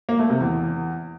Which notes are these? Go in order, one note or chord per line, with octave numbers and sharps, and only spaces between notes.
A#3
A3
C3
E2